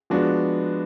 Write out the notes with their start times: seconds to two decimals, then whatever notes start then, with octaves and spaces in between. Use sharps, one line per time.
0.10 F3 G#3 B3 D4 F#4